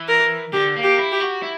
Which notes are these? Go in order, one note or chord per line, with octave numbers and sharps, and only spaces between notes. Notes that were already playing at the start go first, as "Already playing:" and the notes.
Already playing: E3
A#4
D3 G4
A#3
G4
E4
G4
F#4
E4